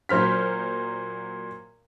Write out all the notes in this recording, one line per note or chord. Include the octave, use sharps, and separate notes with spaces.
A#2 F#3 C5 F6 B6